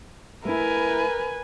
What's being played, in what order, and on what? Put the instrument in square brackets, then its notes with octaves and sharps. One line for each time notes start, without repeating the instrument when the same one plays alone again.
[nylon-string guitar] A3 E4 [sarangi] A#4 [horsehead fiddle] B4 G#5